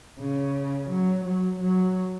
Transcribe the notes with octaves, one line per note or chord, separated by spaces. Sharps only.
C#3
F#3
F#3
F#3